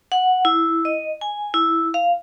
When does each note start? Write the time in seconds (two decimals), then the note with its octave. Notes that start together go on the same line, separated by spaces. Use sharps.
0.12 F#5
0.45 E4
0.85 D#5
1.21 G#5
1.54 E4
1.94 F5